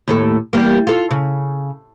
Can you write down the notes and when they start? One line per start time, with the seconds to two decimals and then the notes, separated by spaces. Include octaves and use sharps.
0.08 D#2 A2 A4
0.53 E2 G3 A#3
0.87 F4 A4
1.11 C#3